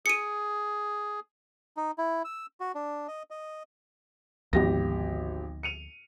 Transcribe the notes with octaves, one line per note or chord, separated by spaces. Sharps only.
G#4 C#7 D#7
D#4
E4
E6
F#4
D4
D#5
D#5
G#1 D2 F3 B3 G4 A#6
C#7 D#7 F7